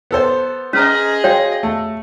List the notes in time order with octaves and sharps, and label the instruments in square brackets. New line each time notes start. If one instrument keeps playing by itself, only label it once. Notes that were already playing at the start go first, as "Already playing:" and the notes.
[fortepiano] B3 A4 C5
[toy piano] C#4 [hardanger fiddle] G#4 D#5 [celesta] A#5 F6 B6
[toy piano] F#4 C#5 G5 [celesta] F5
[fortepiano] A3